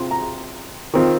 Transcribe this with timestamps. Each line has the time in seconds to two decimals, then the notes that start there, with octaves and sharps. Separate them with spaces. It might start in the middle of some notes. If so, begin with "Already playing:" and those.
Already playing: C3 C4 F4 C6
0.11 A#5
0.94 D#3 C4 F4